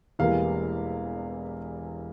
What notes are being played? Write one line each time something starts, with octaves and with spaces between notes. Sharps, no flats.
E1 E2 E3 G3 A#3 F5